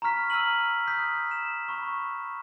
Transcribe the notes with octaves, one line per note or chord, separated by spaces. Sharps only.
A#5 B5 C#6 F6 B6
E6 F6 B6 D#7 F#7
D#6 F#6 G6 B6
E7
B5 C#6